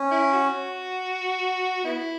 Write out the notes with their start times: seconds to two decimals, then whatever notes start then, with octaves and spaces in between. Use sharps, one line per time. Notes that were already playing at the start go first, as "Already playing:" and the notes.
Already playing: C#4
0.11 E4
0.33 F#4
1.85 B3 E4